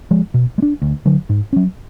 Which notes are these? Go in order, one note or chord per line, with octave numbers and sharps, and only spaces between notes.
F3 G#3
B2
G#3
D4
D2
D3 F#3
G#2
F#3 C#4